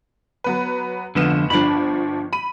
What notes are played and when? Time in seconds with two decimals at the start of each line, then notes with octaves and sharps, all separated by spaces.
0.44 F#3 B3 B4
1.15 F1 D3 F3 B3 E7
1.50 G1 F3 D4 B5
2.33 B5 D#7